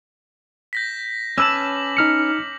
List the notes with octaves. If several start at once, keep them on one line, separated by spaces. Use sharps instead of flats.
G6 A#6 B6
C#4 B4 A5 D6 E6 F#7
D#4 F6 C#7